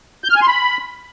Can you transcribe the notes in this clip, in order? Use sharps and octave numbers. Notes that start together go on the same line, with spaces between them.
G6
F6
G#5
C6
B5